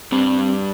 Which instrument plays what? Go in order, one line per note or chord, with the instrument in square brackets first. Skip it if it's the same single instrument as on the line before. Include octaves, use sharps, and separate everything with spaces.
[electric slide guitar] G2 G3 [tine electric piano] C4